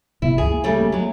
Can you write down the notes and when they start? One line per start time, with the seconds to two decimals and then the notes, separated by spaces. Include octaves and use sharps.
0.22 G#1 C3 B3 E4
0.38 C#2 G2 E3 G#4
0.51 A#3
0.64 C#3 G3 A3
0.80 A#3 C#4
0.92 F#3 G#3